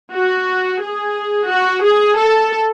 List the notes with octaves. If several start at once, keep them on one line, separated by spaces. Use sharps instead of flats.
F#4
G#4
F#4
G#4
A4